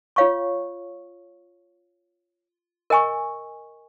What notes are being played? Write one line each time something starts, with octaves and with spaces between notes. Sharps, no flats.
F4 C#5 F5 C#6
A#4 D#5 G#5 C#6